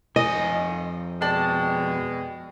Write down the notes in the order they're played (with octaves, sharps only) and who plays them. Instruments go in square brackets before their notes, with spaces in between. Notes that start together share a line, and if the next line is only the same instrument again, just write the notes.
[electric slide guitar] F2 G#5 [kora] D#5
[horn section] B2 G#3 [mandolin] D5 G5 A5